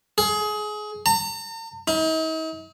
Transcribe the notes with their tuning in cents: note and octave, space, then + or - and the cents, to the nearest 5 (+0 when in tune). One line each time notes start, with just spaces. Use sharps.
G#4 +25
A#5 -45
D#4 +45